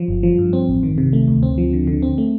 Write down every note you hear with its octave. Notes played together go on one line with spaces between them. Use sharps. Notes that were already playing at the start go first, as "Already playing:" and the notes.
Already playing: F3
G1
F3
G2
C4
A1
D#3
C3
A3
D2
C4
F3
D3
D3
C4
A3